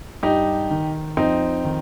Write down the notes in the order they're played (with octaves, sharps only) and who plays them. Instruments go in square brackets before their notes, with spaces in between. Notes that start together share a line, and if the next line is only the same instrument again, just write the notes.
[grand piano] G2 D#4 G4
D#3
F2 C4 D#4
D#3